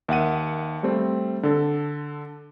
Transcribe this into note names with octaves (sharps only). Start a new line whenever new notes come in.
D#2 E5 F#5 D#7
G3 A3 C4
D3 A4